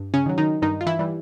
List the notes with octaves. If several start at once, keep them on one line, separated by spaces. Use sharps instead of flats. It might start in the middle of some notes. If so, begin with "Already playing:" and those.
Already playing: G2
C#3 C#4
D#3 F#3
D#3 D#4
G2 D#3 D#4
F4
E3 E4
E3 G3